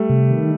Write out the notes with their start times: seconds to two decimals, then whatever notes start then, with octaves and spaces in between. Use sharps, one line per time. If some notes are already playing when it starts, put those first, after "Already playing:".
Already playing: G3 A3
0.09 C3
0.29 D#3